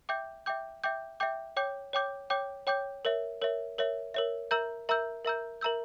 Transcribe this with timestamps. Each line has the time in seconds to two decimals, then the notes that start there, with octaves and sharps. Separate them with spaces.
0.09 E5 G5 D6 G6
0.46 E5 G5 D6 G6
0.84 E5 G5 D6 G6
1.20 E5 G5 D6 G6
1.57 C#5 G5 D6 G6
1.93 C#5 G5 D6 G6
2.30 C#5 G5 D6 G6
2.67 C#5 G5 D6 G6
3.05 A#4 C#5 E5
3.41 A#4 C#5 E5
3.78 A#4 C#5 E5
4.14 A#4 C#5 E5
4.51 A#4 E5 A#5 E6 G6
4.89 A#4 E5 A#5 E6 G6
5.25 A#4 E5 A#5 E6 G6
5.61 A#4 E5 A#5 E6 G6